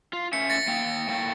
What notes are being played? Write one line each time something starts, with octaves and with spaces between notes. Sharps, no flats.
F4
A3 C#4 E5 C#7
A6 A#6 C#7
A#3 G5
A2 A#3 G5